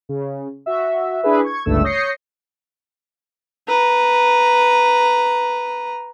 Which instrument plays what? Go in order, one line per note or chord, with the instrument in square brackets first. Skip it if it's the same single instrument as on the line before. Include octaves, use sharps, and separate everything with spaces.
[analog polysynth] C#3
F#4 E5
D4 E4 G#4 B4 E5
C#6 G#6
G1 C#2 G2 A3 E6
C#5 D#6 G6 A#6 C7 C#7
[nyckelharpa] B4 A#5